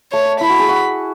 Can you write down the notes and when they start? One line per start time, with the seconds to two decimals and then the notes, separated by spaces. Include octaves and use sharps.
0.12 A3 C#5
0.41 E4 B5
0.50 F#4
0.59 G#4
0.68 F#4